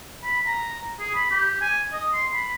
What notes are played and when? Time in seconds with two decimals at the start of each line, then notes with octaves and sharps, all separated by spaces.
0.24 B5
0.47 A#5
1.00 G#4
1.15 B5
1.31 G4
1.61 G#5
1.93 D#5
2.13 C6
2.34 B5